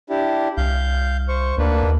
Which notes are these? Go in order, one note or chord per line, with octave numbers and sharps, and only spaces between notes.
D4 E4 G4
C2 F5 G6
C5 C#6
D2 A#3 D4 B4
D#2